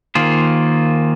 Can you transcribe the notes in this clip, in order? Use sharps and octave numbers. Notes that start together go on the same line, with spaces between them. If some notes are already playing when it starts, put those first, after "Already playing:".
D#3 A#3 F4 G#4 C5